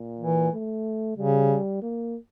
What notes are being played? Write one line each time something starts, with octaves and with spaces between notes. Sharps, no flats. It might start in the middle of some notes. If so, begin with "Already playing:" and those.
Already playing: A#2
E3
A3
C#3 G3
A#3